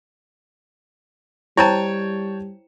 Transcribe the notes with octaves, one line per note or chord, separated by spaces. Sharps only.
G3 E4 C5 C#5 G5 A5 A#5